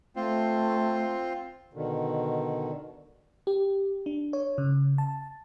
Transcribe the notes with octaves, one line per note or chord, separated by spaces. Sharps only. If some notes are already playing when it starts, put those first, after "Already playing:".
A3 C4 F4
B2 D3 D#3
G4
D4
C#5
C#3
A5